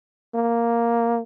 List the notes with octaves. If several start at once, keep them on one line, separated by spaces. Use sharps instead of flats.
A#3